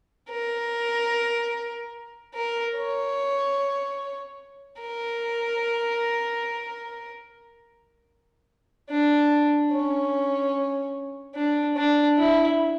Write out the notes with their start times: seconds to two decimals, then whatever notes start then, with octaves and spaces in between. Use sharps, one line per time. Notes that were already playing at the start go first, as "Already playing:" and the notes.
0.30 A#4
2.34 A#4
2.75 C#5
4.80 A#4
8.90 D4
9.71 C#4
11.35 D4
11.76 D4
12.17 E4